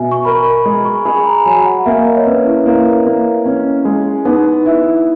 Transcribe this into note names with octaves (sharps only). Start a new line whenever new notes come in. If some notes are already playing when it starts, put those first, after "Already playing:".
Already playing: B2 E5 G#5
C#6
A#4 B5
B5
G#3
C#6
G#4 B5
A#5
F#3 G#5
F#5
A#3 E5
D#5
C#5
C#4 B4
E4
A#3
A#3
C#4
G#3
B3 D#4
E4